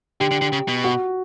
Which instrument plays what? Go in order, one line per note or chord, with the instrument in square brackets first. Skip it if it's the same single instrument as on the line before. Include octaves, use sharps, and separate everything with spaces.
[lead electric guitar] D3 [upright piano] G4
[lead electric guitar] D3
D3
C#3
B2
[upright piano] F#4